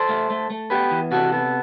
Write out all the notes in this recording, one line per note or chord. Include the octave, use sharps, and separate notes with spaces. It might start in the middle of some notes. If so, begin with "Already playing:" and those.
Already playing: A4 C5
A3
A3
A3
B3 G4 B4
E3
C3 F#4 A4
B3